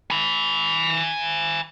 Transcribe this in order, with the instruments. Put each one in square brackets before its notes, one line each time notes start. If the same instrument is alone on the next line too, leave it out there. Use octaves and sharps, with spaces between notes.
[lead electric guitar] G#5 B5